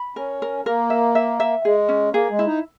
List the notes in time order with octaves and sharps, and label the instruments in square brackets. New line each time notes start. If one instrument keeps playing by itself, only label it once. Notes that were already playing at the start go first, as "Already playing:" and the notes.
Already playing: [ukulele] B5
[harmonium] C#4 [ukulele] A#4
[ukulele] A#4
[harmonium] A#3 [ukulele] A#4
[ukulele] E5
E5
E5
[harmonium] G#3 [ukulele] G#4
[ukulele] C#4
[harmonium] A#3 [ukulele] G#4
[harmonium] G#3
[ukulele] E4
[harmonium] D#4